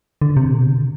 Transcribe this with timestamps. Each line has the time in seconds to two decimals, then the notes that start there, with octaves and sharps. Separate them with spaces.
0.22 D3
0.37 C3
0.52 B2
0.67 D3